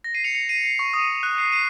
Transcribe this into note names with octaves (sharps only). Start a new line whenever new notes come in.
A#6
C7 D#7
C#7 F7
C#7 F7
C7 D#7
C7
C#6
D#6
F#6
C7 D#7
C7 D#7